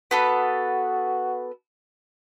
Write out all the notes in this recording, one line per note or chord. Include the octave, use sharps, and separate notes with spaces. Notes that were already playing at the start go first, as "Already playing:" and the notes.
B3 F#4 A4 B4